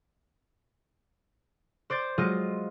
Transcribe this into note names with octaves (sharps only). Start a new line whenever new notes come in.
C5 D5 G6 A6
F#3 G#3 F4 D#5